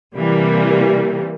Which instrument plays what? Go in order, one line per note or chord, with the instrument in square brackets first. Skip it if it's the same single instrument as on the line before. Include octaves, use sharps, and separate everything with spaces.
[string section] C3 E3 G3 A#3